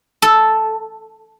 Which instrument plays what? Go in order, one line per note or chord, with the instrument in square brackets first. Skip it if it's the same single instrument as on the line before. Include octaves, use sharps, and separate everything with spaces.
[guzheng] A4